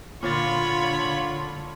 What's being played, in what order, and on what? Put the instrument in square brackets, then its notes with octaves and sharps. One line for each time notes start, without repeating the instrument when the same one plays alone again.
[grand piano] A#2 A6 [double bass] D3 [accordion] F4 [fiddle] C#5 B5